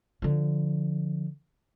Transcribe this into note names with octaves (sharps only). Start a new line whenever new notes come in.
D3 F3